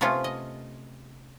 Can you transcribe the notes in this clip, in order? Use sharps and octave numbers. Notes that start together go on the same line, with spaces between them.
C3 A3 B3 C#4 F4
D#5